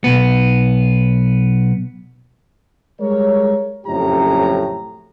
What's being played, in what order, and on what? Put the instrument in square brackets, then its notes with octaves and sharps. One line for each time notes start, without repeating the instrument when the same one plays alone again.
[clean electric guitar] B1 B3
[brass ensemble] G3 G#3 A#4 C#5
F#1 F2 A2 C#4 G4 A#5